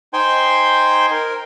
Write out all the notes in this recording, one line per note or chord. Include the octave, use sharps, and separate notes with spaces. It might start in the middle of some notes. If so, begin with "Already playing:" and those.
D#4 C5 G5 G#5 C6
A#4